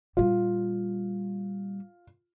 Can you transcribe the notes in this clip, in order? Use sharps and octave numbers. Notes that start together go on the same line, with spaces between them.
A#2 G3 F4